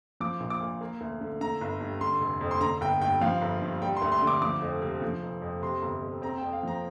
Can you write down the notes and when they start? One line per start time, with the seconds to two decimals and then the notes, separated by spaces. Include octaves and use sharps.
0.20 F3 D6
0.40 A#1
0.50 D6
0.61 A#2
0.81 A#3
1.01 D2
1.21 D3
1.41 D3 A#5
1.61 G1
1.81 G2
2.01 D3 C6
2.21 F1
2.41 F2
2.51 C6
2.61 D3 A#5
2.81 G1 G5
3.02 G2 G5
3.21 F3 F5
3.42 G1
3.62 G2
3.81 G3 G5
3.97 C6
4.02 D2
4.12 C6
4.22 D3
4.27 D6
4.42 F3 D6
4.62 F2
4.82 C3
5.02 F3
5.22 F1
5.42 F2
5.62 C3 C6
5.82 G1
6.02 F2
6.22 C4 A#5
6.38 G5
6.43 F2
6.53 F5
6.63 F3 A#5